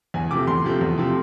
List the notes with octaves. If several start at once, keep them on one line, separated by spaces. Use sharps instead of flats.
E2 G#5
C3 F3 A3 D6
E2 C6
C3 F3 A3
E2
C3 F3 A3